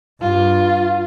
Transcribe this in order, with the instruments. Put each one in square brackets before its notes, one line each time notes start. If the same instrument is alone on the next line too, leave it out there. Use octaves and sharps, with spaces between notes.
[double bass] G2 [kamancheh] F4